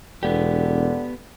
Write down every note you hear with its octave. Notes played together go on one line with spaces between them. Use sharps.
E1 D3 B3 G4